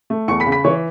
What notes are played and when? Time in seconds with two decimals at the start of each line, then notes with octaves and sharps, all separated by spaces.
0.10 A3
0.28 E2 C#6 C#7
0.40 B5 B6
0.46 C#3
0.52 B5 B6
0.64 E3 C#5 C#6